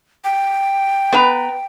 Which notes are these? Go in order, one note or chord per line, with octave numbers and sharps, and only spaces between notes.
G5
B3 B4 A#5